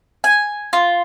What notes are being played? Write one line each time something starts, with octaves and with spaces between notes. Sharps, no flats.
G#5
F4